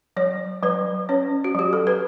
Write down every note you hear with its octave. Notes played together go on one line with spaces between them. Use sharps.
F#3 C#5
F#3 B4
C#4 C#5
F#4
F#3 G4
A4
B4